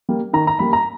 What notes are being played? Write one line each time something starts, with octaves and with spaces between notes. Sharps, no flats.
G3 A#3
D#3 A#5
A#5
G3 A#3 B5
A#5